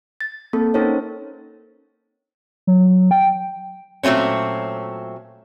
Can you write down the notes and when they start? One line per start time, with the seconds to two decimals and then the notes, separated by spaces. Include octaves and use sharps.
0.21 A6
0.53 A#3 C4 A4
0.74 C#4 D#4 A#4 C5 C#5
2.67 F#3
3.11 G5
4.03 A#2 F#3 A3 C4 C#4